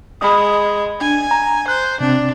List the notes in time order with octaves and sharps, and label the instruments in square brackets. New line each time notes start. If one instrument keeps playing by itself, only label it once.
[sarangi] G#3 [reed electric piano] B5 D#6
[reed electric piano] D4 [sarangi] G#5
[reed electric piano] A#5
[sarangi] C5 [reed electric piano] F#6
[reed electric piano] C3 C4 [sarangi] D4